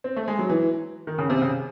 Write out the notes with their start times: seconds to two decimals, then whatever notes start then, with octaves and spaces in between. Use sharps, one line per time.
0.04 C4
0.17 A3
0.28 G#3
0.39 F#3
0.49 E3
1.07 D#3
1.19 C#3
1.30 C3
1.42 C#3